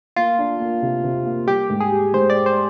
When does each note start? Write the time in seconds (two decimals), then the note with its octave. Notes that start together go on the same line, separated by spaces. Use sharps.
0.16 A#3 F4
0.39 D4
0.60 A#3
0.82 C3
1.04 C3
1.26 A#3
1.48 G3 G4
1.70 G#2
1.80 G#4
1.92 G4
2.14 G#2 C5
2.30 D5
2.35 G4
2.46 C5